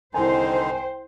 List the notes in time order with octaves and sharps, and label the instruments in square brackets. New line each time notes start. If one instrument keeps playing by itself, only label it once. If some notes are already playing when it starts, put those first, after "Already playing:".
[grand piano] C2 G#5 [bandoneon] D3 D#3 D#4 [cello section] C5 [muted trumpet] G5